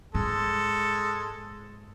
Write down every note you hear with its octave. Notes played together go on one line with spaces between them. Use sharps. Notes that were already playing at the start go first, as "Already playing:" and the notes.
G#2 G#3 A4